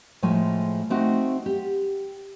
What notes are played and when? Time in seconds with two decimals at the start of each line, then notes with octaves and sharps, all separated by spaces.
0.22 A2 F3 G#3 A3 G#5
0.90 A3 C4 D#4 F#4
1.46 G4